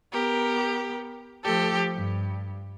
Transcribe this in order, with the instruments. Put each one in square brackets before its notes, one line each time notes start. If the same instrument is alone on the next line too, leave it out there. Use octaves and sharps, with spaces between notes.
[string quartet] B3 G4 A#4
F3 A3 G4 A4
G2